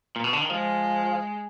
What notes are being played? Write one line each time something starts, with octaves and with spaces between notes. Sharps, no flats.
A#2
B2
D3
D#3
F3 G#3